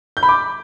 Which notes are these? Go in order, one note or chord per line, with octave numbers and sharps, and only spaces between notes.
G6
B5
D6